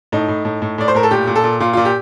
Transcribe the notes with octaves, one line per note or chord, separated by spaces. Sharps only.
A2 D#4
A2
A2
A2
A2 D5
C5
A2 A#4
A4
A#2 G4
A#2
A4
A#2
A#2 F4
F4
A#2
G4